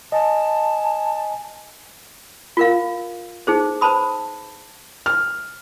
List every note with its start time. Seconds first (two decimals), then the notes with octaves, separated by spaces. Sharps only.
0.12 D#5 G#5 A5
2.57 F4 A#4 F5
3.47 D#4 G#4 C5
3.81 B4 C5 A5 B5 D#6
5.06 F6